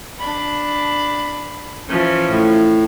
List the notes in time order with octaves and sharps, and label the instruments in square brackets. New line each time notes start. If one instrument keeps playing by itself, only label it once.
[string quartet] D4 B5
E3 F3 C#4
[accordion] A2